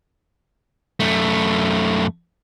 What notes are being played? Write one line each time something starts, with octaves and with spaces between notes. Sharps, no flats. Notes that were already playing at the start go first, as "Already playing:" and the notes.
F#2 A3